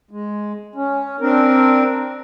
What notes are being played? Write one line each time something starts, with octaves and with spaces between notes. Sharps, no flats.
G#3
C#4
C4 D4 A#4